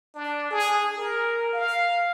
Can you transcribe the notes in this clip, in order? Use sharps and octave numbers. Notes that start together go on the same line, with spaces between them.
D4
G#4
A#4
F5